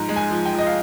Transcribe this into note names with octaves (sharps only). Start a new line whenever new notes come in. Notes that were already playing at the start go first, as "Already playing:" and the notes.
Already playing: G#2 F3 A#5
G#3
G#5
F3
G5
F3 D#5
F5